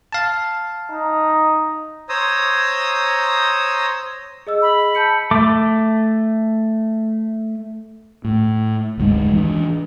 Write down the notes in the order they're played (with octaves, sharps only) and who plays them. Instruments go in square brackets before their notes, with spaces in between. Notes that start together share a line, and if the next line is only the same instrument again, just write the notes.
[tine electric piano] F5 A5
[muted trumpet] D#4
[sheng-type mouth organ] C5 C#5 A#5 D#6 E6
[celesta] G#4 D#5 E6
[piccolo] B5
[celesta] A5 G6 C#7
[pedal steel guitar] A3 D6
[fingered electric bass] A2
F1 D2 G#2 G#3
E3 D4